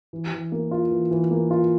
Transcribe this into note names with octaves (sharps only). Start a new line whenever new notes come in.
E3
E3
A#3
F4
E3
E3
A#3
F4